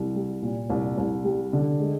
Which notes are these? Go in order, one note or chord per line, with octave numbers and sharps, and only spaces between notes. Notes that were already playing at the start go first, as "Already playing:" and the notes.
Already playing: C2
G3
A#2
C2
C2
G3
D3
G#3